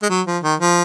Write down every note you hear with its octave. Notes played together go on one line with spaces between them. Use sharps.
G#3
F#3
F3
D#3
F3